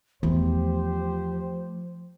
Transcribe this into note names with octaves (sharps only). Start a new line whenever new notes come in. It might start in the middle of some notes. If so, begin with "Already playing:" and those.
E2 F3 A3 G4 C5